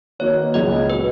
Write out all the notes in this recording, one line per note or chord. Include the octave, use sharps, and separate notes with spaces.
D#3 A#3 D#4 F#4 B4 C#5
C#2 C#3 G#3 D#5
A#2 F#3 B3 B4